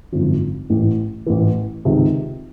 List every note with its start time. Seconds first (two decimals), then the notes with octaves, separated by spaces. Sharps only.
0.13 G#1 F#2 D3 F3
0.70 A1 A2 E3
1.26 A1 A2 E3
1.85 C#2 C3 D#3